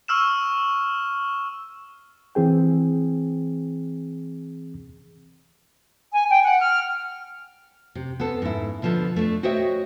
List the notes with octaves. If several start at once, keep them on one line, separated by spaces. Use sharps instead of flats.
C#6 E6 F6 E7
E3 C4 G#4 G5
G#5
G5
F#5
F6
C3
B3 C4 A4
G#2 E4
B2 D3 F3 B3 A4
A3 D4
F#4 C5 C#5 D#5 E5 G5